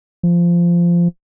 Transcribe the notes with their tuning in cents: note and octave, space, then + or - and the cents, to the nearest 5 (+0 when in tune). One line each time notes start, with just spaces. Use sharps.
F3 -15